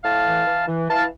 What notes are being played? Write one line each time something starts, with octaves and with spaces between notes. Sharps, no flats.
A2 F5 A5
E3
E3
E3
E3 F5 A5